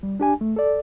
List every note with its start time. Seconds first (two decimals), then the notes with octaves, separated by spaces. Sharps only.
0.03 G3
0.20 D4 G4 G#5
0.41 A3
0.56 A4 D5